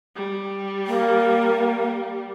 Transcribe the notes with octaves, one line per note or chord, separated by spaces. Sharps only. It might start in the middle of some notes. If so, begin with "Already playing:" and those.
G3
A#3